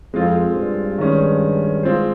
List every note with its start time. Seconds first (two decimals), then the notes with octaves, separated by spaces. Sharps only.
0.13 F2 G#3 C4 F4
0.56 G2
0.98 D#3 G#3 C#4
1.83 G#3 C4 F4 C5